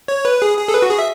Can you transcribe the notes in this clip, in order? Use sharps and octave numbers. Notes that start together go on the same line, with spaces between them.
C#5
B4
G#4
G#4
A4
B4
F#4
G#4
E5